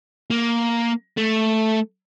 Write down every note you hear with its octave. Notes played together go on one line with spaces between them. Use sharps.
A#3
A3